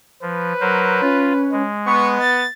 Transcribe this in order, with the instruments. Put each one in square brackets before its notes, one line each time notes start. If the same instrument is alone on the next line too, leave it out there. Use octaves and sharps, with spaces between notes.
[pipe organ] F3 [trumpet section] B4
[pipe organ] F#3 A#4 C5
[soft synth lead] C#4 [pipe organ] F4
[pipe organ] G#3
[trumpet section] B3 [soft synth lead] C#6
[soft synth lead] A6